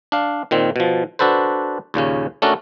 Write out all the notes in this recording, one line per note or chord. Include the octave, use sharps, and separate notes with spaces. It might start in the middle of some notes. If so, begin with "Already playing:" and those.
D4 F5
A#2 D#3 C4
B2 F3
D4 F#4 A4 B4 C5
D#2 A#2 C#3 C#4
A3 C#4 D4 F#4 A4 A#4